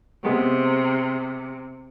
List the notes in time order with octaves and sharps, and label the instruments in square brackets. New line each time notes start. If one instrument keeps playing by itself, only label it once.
[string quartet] C3 [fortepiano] G#3 B3 G4